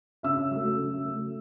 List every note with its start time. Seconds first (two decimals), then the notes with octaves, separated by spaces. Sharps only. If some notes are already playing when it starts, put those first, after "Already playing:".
0.23 C#3 E5 E6
0.51 F#3 A3
0.78 C#3
1.06 F#3 A3